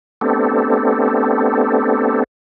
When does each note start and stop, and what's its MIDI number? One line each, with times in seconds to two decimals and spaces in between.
0.21 2.24 57
0.21 2.24 59
0.21 2.24 60
0.21 2.24 62
0.21 2.24 67
0.21 2.24 69